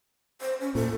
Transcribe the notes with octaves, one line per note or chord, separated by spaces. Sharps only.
C5
C#4
A#2 A4